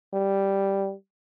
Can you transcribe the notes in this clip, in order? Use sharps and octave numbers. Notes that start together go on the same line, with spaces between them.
G3